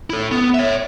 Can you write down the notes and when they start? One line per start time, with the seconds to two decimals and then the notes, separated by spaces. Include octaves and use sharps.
0.10 E4 A4
0.31 B3
0.55 C#5 E5